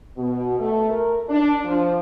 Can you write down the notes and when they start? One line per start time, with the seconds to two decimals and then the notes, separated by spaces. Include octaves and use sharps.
0.17 B2
0.60 A3
0.90 A#4
1.29 D4
1.64 F3